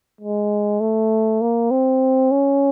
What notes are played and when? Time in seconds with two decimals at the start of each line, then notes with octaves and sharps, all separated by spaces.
0.21 G#3
0.81 A3
1.41 A#3
1.71 C4
2.32 C#4